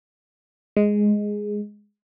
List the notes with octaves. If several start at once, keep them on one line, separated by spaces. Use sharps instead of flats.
G#3